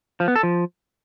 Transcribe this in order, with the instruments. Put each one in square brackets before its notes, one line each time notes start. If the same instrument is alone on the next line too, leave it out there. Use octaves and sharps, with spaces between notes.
[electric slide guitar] F3
B3
A4
F3